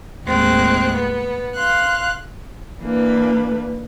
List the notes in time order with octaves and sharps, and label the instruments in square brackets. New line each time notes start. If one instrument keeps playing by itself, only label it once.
[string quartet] D#2 A2 G#3 C4 F#6
B3
F5 C6 F#6
E3 A#3 D4 B4